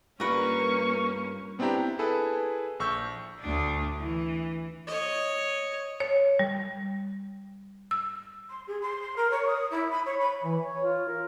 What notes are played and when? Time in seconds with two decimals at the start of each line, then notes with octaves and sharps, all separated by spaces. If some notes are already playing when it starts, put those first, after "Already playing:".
0.20 G2 G3 A#3 C#4 F4 A#4 B4 C#6
1.59 B3 C4 D4 E4 G4 A#5
1.75 E4
1.99 E4 G#4 A4 B4
2.80 A#1 C#6 E6 G6
3.40 D2 D4
3.99 E3
4.87 C#5 D#5
6.00 C#5
6.39 G3
7.91 E6
8.50 C6
8.67 G#4
8.81 C6
9.01 C6
9.16 A#4
9.30 C#5
9.46 D#6
9.71 E4
9.91 B5
10.05 C#5
10.19 B5
10.44 E3
10.63 C#5
10.84 F4
11.09 A#4